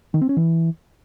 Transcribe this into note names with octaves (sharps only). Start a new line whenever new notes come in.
D#3
C4
C#4
E3